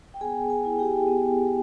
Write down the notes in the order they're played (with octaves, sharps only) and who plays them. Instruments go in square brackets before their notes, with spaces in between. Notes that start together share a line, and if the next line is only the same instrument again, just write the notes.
[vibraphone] G5
B3 G#4 G#5
G#4 G#5
E4
G4 G5
B3